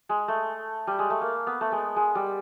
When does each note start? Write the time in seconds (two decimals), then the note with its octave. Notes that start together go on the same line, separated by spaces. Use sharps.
0.09 G#3
0.28 A3
0.87 G3
0.99 G#3
1.10 A3
1.21 A#3
1.47 B3
1.61 A3
1.72 G#3
1.96 G#3
2.15 G3